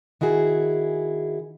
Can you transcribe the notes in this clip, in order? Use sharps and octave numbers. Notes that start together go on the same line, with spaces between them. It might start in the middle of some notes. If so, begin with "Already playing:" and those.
D#3 E4 F#4 G#4